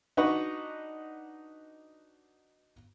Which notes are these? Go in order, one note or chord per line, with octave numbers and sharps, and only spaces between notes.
D4 D#4 F#4 B4 F#5 C#6